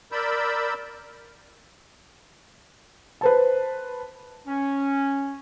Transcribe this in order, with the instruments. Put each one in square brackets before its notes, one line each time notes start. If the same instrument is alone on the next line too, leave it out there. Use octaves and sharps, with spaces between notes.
[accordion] A#4 D5 B5 E6 G6
[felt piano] B4 C5 A5
[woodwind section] C#4